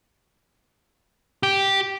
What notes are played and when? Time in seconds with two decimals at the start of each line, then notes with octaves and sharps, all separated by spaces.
1.43 G4